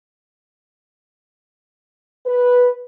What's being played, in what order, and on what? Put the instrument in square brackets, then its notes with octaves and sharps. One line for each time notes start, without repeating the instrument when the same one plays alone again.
[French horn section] B4